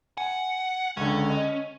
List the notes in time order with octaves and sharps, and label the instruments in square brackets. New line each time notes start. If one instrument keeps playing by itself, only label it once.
[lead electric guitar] F#5 [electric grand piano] G#5
[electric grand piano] C#2 D3 [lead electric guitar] C#4
[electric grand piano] D#5